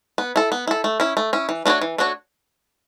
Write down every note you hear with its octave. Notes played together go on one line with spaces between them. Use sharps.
B3
E4 A4
B3
E4 A4
A3
C#4 E4
A3
C#4 E4
E3
A3 D4 F#4 C#5
E3
A3 D4 F#4 C#5